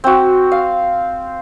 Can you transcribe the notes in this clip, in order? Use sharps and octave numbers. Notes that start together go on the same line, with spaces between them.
C4 F#4
F5